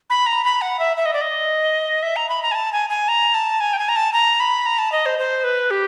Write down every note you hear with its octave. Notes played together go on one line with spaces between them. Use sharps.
B5
A#5
B5
F#5
E5
E5
D#5
D5
D#5
E5
A#5
B5
A#5
G#5
A5
G#5
G#5
A#5
A5
G#5
G5
G#5
A#5
A5
A#5
B5
A#5
A5
D#5
C5
C5
B4
G4